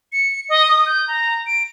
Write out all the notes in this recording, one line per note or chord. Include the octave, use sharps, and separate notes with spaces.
C#7
D#5
D#6
G6
A#5
D7